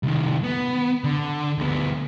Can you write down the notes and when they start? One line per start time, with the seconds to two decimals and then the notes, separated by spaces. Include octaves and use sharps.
0.03 C2 D#3
0.43 B3
1.04 D3
1.58 D2 B3